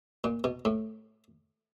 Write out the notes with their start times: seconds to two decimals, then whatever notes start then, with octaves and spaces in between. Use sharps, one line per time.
0.24 A#2
0.44 B2
0.65 A2